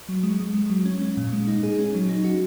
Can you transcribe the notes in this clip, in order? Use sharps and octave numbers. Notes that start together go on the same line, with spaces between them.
F#3
G#3
G#3
G#3
F#3
C#4
C#4
A#2
G#3
D#4
G#4
C#4
F#3
D#4
F#4